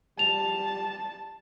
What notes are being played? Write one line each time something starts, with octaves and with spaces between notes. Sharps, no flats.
G3 A5 F7